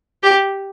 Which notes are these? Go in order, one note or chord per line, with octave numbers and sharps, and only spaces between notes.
G4